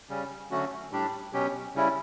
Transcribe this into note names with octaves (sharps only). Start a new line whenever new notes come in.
C#3 G3 C#4
D3 F#3 A3 C#4 F#4
A2 G3 D4 G4
B2 F#3 C#4 G4
C#3 G3 C#4 E4